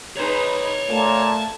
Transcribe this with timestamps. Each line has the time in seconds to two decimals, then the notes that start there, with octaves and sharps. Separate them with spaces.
0.17 D#4 G#4 B4 C#5 C6
0.89 A#2 A3 A5 G#6